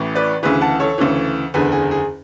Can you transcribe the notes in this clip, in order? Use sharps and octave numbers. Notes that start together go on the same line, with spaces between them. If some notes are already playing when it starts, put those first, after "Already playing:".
Already playing: A1 A2 E3
B4 D5
D2 C#3 E3 G#4 B4
F#5 A5
A4 C#5
D2 C#3 E3
F#1 E2 D3 G#4 B4
G#4
G#4